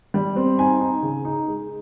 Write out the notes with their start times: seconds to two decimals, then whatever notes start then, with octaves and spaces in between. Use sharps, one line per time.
0.14 G3
0.36 C4
0.58 D#4 G#5
0.81 D#4
1.03 C#3
1.25 D#4
1.48 G#3